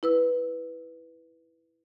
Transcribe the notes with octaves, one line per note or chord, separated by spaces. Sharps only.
E4 B4 E6